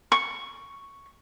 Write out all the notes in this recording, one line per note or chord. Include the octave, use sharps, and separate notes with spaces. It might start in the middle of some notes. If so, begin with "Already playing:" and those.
C#6